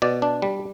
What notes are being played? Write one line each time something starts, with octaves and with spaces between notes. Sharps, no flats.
B2 D5
D4
G3